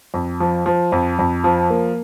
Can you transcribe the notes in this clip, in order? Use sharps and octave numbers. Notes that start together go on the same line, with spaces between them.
F2
F3
F3
F2
F2
F3
A#3